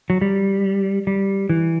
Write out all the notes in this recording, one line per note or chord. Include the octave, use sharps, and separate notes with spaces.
F#3
G3
G3
E3